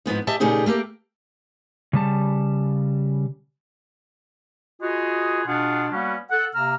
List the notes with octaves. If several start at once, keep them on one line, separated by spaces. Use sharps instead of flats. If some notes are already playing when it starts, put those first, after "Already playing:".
G#2 F3 B3 D#4
G4 D#5 E5 A5
A#2 C#3 A3 D#4 G4 G#4
A3 A#3 G4 A#4
C#3 G3 A5
F4 F#4 G#4 B4 D#5
B2 D4 F4 G#4 F#5
G3 A#3 B3 C#4 F#4
A4 F#5
C3 A#3 A#5 E6 F6